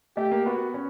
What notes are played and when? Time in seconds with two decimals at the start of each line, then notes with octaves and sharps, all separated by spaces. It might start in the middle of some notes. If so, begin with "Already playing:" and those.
0.16 A3 G4
0.31 A#3
0.46 B3 F#4
0.74 C#4